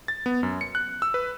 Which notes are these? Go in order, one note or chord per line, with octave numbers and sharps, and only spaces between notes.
A6
B3
F#2
C#7
F#6
E6
B4